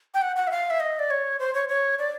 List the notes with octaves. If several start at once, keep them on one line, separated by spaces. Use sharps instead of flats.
G5
F#5
F#5
E5
F5
E5
D#5
D5
C#5
C5
C#5
C#5
D5